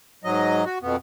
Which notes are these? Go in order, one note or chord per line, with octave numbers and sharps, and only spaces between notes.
G#2 F#3 D#5
F#4
F2 B2 B3